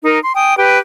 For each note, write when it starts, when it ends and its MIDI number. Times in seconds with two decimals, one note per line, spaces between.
0.03 0.19 63
0.03 0.19 70
0.21 0.32 84
0.35 0.56 79
0.35 0.56 80
0.35 0.56 87
0.57 0.79 67
0.57 0.79 71
0.57 0.79 79